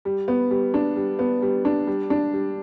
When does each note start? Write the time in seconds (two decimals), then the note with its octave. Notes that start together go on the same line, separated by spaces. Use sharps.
0.05 G3
0.28 B3
0.51 G3
0.74 D4
0.96 G3
1.19 B3
1.42 G3
1.65 D4
1.87 G3
2.10 D4
2.33 G3